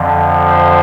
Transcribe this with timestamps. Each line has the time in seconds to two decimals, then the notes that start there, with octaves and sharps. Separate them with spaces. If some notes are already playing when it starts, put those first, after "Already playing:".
Already playing: F2 D3 F3
0.51 C5